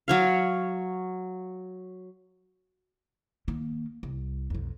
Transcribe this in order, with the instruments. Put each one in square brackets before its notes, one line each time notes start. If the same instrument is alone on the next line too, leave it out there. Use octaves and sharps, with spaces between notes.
[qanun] F#3 C#5 F5
[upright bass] D#3 A#3
C2
B1 F2